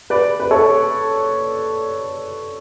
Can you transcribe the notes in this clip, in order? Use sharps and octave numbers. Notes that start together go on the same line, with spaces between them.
B4 D5
B4
A4 C#5